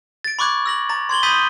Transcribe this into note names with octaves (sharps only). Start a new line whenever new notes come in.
A6 D7
B5 C#6 D6 F#6 G#6
E6 A#6 F#7
A#5 A6
C6 G#6 F#7 G7
B5 D#6 G6 A6 B6 D#7